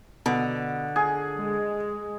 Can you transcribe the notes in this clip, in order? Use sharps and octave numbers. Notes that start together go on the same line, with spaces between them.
B2 D3
G#4 G#5
G#3